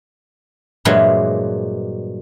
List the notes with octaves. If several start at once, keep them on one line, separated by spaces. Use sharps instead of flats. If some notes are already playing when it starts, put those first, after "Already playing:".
G2 A#2 E3 F#3 G#3